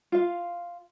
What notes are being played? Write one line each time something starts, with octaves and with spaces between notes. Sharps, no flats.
F4 F5